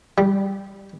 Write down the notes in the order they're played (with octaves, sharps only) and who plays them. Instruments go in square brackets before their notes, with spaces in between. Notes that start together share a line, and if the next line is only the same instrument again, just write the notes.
[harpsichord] G3